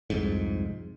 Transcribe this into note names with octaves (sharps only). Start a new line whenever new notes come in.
C2 F2 G#2